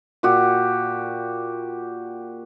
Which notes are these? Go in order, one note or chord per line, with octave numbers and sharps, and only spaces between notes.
A#2 F#4 G4